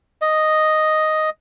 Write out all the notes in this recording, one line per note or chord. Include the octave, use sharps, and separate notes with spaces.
D#5